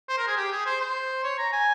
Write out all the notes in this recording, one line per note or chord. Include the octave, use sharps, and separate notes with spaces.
C5
A#4
G#4
G4
G#4
C5
C5
C#5
A#5
G#5